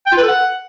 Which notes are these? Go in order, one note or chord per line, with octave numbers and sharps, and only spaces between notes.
G5
F4
B4
A4
F#5